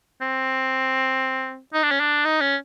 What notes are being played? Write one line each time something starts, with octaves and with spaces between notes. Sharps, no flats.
C4
D#4
D4
C#4
D4
D#4
C#4